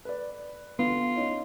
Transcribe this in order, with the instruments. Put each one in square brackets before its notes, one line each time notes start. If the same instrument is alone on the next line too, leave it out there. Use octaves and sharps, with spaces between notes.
[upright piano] B4 D5
[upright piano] D3 [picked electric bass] B3 [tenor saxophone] F4
[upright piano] C#4 D#4 C#5